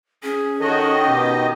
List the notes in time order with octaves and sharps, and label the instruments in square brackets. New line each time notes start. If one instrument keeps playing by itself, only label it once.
[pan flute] C#4 [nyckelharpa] G#4
[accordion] D#3 D#5 [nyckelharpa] F#4 C#5 [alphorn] A4
[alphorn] B2 [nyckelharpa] G4